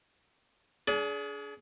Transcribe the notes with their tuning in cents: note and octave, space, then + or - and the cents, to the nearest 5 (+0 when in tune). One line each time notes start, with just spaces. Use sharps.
D4 -35 G#4 +25